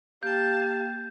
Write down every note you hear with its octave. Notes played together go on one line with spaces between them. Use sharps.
A#3 G4 F5 G5 A5 G6